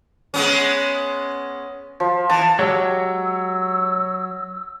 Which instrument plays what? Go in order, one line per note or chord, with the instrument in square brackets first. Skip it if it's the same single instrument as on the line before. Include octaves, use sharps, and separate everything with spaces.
[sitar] G#3 B3 C#4
[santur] F3
[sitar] E3 [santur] A5
[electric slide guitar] F#3 [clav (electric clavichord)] G#3 G4 [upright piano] C#5 [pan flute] E6